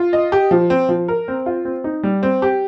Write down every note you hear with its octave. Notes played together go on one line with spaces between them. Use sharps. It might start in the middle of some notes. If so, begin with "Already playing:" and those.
Already playing: F4
D#5
G4
F3
C4
F3
A#4
C4
F4
C4
D#4
G3
C4
G4